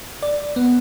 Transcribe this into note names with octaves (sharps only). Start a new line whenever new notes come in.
D5
B3